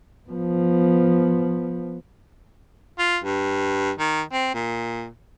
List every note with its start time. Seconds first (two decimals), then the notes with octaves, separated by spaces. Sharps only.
0.30 F3 B3
2.98 F4
3.24 G2
3.99 D#3
4.32 C4
4.54 A#2